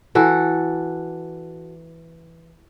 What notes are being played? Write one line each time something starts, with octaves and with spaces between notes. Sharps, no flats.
E3 F#4 A4